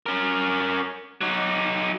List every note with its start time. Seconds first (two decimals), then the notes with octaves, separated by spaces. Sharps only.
0.06 C#4 A#4
1.21 F#3 D#4